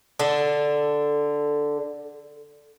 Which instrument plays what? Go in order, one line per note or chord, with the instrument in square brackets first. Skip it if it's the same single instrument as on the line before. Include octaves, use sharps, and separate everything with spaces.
[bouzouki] D3 D4 A4